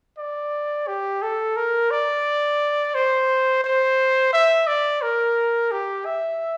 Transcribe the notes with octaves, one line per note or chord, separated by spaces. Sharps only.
D5
G4
A4
A#4
D5
C5
C5
E5
D5
A#4
G4
E5